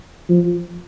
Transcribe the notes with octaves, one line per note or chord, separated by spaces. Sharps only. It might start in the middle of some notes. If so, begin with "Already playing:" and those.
F3